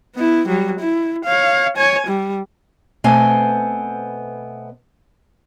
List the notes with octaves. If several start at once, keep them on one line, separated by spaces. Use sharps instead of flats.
B3 E4
F#3 G3
E4
C#5 F5
C#5 G#5
G3
B2 A3 B3 C4 C5 G#5